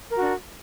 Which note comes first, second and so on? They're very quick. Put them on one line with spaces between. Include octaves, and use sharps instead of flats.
A#4 F#4 D4